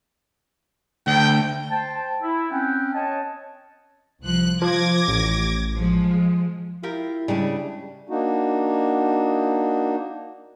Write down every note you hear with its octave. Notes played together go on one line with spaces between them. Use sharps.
D2 G5
C5 G5 A5
E4
C4 C#4 F#5 G5
C#5 D#5 A5
C2 F3 F#6
F3 D6 G#6 A#6
A1
F3 G#3
E4 F4 G4 A#4
C#3 G3 G#3 D4
A#3 D4 D#4 F#4